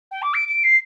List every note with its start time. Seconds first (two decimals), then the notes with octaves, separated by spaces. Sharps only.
0.11 G5
0.22 D6
0.34 D7
0.48 D7
0.63 C7